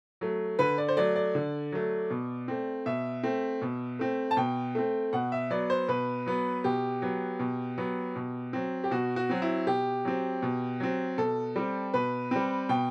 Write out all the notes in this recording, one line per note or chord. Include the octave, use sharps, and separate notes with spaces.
F#3 A3
D3 B4
D5
C5
F#3 A3 D5
D5
D3
F#3 A3
B2
A3 C4
B2 E5
A3 C4
B2
A3 C4
A5
B2 G5
A3 C4
B2 F#5
E5
F#3 B3 D5
C5
B2 B4
F#3 B3
B2 G4
F#3 B3
B2
F#3 B3
B2
F#3 C4
G4
B2 F#4
F#4
F#3 C4
E4
B2 G4
F#3 C4
B2
F#3 C4
B2 A4
G3 C4
B2 B4
G3 C4
B2 G5